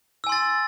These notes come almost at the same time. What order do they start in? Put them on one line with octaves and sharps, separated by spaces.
E6 G#5 C6 A6